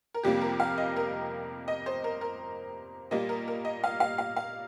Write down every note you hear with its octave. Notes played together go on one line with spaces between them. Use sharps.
A#4
F2 C3 G3 A#3 G4
A#4
F5
D#5
A#4
D#5
C5
A#4
A#4
A#2 G3 A#3 D#5
A#4
A#4
D#5
F5
F5
F5
F5